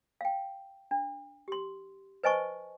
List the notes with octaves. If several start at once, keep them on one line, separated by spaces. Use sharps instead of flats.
F5 G5
D4
G4 C6
B4 C5 D#5 G#5 A5 C#6